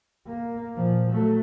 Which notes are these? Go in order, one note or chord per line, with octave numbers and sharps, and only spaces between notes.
A#3
A#2 F3
F#3 A3